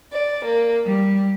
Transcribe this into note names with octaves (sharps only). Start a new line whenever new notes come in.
D5
A#3
G3